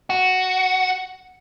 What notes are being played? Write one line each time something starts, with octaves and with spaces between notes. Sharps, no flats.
F#4